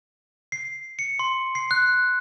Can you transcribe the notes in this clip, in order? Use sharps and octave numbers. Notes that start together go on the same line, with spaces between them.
C7
C#7
C6
C7
F#6